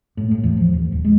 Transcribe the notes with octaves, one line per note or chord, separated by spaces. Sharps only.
A2
A2
E2
F3
D#2
D#1
G#3